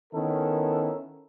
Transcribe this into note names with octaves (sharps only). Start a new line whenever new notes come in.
D#3 B3 C#4 E4 A4 A#4